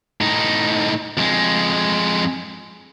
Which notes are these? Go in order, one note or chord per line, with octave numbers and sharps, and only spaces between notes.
A2 D#4
F2 G#3